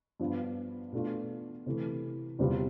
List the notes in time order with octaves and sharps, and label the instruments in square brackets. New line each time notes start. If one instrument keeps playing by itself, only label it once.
[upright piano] G2 F3 B3
B2 A3 D4 F4
C3 E3 A3
E2 C3 G3 C4 F4